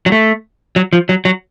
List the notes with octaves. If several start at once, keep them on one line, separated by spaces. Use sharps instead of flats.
F#3
A3
F#3
F3
F#3
F#3